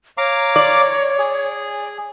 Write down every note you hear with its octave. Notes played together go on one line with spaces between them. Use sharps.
C#5 F5 A#5 D6
D5
G#4